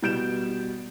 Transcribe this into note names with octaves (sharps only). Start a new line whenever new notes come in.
B2 G3 G6 D7 E7